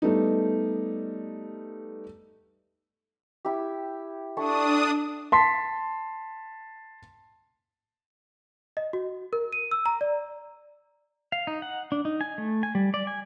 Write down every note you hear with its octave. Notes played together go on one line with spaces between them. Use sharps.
G3 A3 B3 D#4
E4 G4
D4 E4 A4 C#6 D#6
A5 C6 B6
D#5
F#4
A#4
D#7
E6
A#5
D5
F5
D#4
F#5
D4
D#4
G#5
A3
G#5
G3
D5
G#5